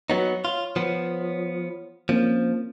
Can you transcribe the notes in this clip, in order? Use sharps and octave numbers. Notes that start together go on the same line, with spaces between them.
F#3 B3 D#4 C#5
F4
F3 B3
F3 A#3 C4 C#4